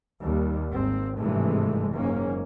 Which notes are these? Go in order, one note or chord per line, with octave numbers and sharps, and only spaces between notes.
D#2 G3
G#1 C4
G#1 G2 C3 E3 G#3 A3
F#1 G#2 A#3 C#4